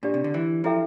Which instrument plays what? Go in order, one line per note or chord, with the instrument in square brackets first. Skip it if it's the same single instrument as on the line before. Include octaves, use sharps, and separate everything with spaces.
[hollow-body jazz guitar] A#2 [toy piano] D4 G4 D5
[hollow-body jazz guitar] C3
D3
E3
[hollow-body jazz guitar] F3 [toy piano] E4 A4 E5 G5